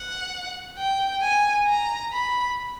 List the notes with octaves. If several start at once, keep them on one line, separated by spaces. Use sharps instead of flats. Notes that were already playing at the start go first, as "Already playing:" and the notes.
Already playing: F#5
G5
G#5
A#5
B5